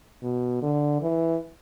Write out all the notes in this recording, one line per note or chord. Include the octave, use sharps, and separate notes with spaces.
B2
D3
E3